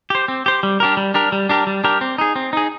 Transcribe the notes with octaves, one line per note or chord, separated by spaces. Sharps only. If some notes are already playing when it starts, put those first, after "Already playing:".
G4 C5
C4
G4 C5
G3
D4 G4 A#4
G3
D4 G4 A#4
G3
D4 G4 A#4
G3
D4 G4 A#4
C4
D#4 G#4
C4
D#4 G#4